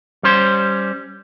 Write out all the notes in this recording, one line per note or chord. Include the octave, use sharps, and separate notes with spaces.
G3 C#4 C5